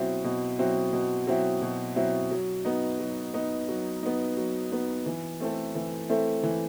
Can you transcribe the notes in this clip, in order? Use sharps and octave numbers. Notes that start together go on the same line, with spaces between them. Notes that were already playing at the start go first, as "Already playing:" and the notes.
Already playing: B2 F#3 C4 E4
B2
F#3 C4 E4
B2
F#3 C4 E4
B2
F#3 C4 E4
F#3
B3 D#4
F#3
B3 D#4
F#3
B3 D#4
F#3
B3 D#4
E3
A3 C4 E4 A4
E3
A3 C4 E4 A4
E3